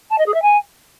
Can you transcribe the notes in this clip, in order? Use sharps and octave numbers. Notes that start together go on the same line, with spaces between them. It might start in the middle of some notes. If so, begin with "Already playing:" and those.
A5
D#5
G#4
E5
G#5